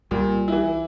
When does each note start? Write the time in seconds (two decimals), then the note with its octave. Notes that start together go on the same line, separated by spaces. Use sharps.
0.11 C2 A#2 G3
0.48 E3 E4